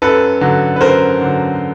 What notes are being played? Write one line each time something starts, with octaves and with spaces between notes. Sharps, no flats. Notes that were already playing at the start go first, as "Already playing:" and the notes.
F#2 A4 B4
D3 F#3
B4
F#2 A#4 C5
D3 F#3